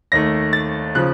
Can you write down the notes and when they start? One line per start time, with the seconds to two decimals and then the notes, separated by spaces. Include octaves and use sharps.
0.12 D#2 D#3 A3 A#6
0.53 A6
0.95 C#3 F3 F#6